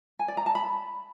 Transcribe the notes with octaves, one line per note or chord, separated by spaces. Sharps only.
G#5
D5
A#5
A5
B5